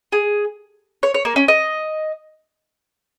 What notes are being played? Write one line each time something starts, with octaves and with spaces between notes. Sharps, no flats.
G#4
C#5
C#5
A#3
C#4
D#5